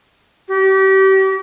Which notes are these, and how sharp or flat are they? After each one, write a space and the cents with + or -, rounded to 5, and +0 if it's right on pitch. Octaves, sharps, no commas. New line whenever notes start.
G4 -35